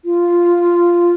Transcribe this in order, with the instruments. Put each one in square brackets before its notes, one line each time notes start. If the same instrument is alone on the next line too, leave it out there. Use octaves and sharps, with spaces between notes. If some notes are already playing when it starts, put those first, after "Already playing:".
[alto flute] F4